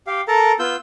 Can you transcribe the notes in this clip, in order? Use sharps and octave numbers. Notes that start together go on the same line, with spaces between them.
G4 F5
A4 A#4 A5 A#5
B3 F4 E6 G6